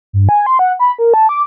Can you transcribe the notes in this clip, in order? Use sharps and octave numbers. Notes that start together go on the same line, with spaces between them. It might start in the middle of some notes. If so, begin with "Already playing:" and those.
G2
G#5
C6
F#5
B5
A#4
A5
D6